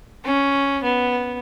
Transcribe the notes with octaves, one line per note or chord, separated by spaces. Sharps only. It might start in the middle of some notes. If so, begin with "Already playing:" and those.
C#4
B3